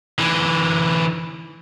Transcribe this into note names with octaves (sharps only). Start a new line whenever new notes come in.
D3 E3